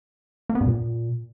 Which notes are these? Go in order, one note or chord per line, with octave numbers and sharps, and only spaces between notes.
A#3
B3
G2
A#2